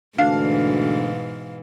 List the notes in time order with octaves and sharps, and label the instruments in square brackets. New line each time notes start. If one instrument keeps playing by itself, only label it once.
[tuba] D2 [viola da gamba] G#2 B2 E3 [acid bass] D4 [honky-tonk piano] F5